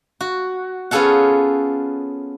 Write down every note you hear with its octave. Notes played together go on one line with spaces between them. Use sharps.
F#4
B3 C#4 F4 G#4 A4 F#5